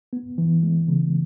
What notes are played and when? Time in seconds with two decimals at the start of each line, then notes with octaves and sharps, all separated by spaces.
0.13 B3
0.38 E3
0.63 G#3
0.88 C#3